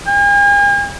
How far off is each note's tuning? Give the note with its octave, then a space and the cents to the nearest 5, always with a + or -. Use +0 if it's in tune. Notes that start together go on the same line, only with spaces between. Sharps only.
G#5 -45